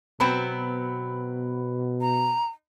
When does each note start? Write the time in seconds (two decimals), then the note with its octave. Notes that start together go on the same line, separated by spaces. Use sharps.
0.20 B2 F#3 B3 C4 B5
2.01 A#5